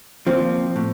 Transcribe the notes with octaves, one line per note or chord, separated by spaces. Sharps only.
A#2 F3 C4
A2